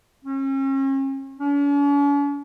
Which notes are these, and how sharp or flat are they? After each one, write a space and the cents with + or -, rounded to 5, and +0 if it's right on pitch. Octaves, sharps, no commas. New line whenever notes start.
C#4 -40
C#4 +45